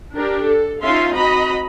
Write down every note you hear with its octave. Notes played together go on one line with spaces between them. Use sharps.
D4 G4 A#4
A4
C#4 D#4 F4 E5 F5 C6
C4 F#4 D#5 A#5 B5